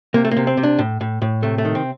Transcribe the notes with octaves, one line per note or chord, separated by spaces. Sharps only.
C3 A#3
A3
A#3
C3
C4
C3
D4
A2
A2
A2
C3 A3
A3
D#3
C4